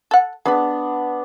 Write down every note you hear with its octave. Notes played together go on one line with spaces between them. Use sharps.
A4 F#5
B3 D4 G#4 B4